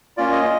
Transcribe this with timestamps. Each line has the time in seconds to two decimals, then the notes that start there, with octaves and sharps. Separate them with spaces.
0.17 A#3 C#4 F4 D5
0.32 D#5